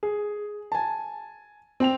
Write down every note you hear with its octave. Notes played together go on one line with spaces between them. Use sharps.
G#4
G#5 A5
C4 G5 F7